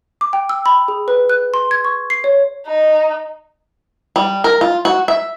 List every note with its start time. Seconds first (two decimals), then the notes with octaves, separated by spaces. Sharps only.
0.21 D6
0.33 G5
0.49 E6
0.66 B5
0.88 G#4
1.08 B4
1.30 F#6
1.54 C6
1.71 G#6
1.85 C#6
2.10 C7
2.24 C#5
2.67 D#4
4.16 G3
4.44 A#4
4.61 F4
4.85 F#4
5.08 E5